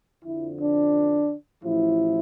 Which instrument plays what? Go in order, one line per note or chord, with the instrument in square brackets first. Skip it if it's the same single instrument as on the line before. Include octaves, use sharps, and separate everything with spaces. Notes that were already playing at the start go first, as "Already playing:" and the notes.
[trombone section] F2 D3 F3 E4
D4
A1 A2 F3 E4